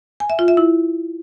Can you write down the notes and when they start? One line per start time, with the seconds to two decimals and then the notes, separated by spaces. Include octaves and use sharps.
0.20 G#5
0.30 E5
0.39 F4
0.48 E5
0.57 E4